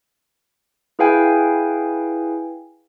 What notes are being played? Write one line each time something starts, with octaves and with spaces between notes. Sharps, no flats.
E4 G#4 B4 F5 G5 G#5